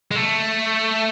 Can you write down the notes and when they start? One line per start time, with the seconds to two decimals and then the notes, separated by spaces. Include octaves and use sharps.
0.11 G#3
0.15 A3